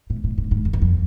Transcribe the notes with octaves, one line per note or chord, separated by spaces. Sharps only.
A2
A2
G#2
G#2
F2
F#2
F2